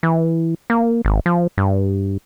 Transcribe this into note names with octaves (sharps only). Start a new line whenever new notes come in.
E3
A#3
G#1
F3
G2